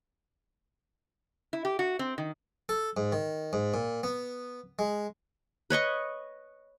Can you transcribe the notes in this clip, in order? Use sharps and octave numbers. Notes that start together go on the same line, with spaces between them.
E4
G4
F#4
C4
D#3
A4
G#2
D#3
G#2
A#2
B3
G#3
B4 C#5 D#5 C#6